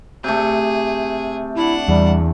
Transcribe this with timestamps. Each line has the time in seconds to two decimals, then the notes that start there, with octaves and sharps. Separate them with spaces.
0.24 C3 A3 G#4
1.56 D4 E4 F#5
1.88 E2 G3